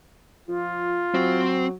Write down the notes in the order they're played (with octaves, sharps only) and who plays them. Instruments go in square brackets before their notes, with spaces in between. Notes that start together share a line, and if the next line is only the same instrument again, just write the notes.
[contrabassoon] F3 [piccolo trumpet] F4
[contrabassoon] F#3 [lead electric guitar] C4